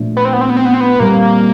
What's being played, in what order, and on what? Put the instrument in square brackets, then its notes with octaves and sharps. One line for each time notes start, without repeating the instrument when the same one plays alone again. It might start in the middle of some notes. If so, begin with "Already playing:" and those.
Already playing: [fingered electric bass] A#2 F3 A3 D4
[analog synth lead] B3
C4
B3
C4
B3
C4
B3
C4
B3
[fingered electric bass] A#2 G3 C4 [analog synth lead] A#3